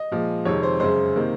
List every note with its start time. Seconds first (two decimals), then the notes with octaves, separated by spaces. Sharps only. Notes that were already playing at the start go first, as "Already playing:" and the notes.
Already playing: D#5
0.12 A#2 F3 G#3
0.45 F2 C3 D#3 G#3 C#5
0.63 C5
0.80 F#2 C#3 G#3 C5
1.16 C3 D#3 A#3